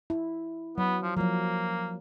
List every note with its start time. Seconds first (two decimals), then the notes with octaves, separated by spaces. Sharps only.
0.10 E4
0.78 F#3 B3
1.03 F3
1.17 F3 F#3 A#3